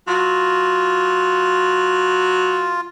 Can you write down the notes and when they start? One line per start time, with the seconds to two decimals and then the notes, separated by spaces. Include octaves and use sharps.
0.07 F#3 F4